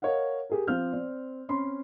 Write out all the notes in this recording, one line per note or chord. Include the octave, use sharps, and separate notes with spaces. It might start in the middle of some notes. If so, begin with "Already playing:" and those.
A#4 C#5 D#5 F5 F#5
G4 G#4 A#4
F3 C4 F5 F6 G6
C4 D5
C4 C#4 B5 C6